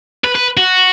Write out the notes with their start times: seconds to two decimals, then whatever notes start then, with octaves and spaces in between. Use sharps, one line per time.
0.24 B4
0.35 B4
0.57 F#4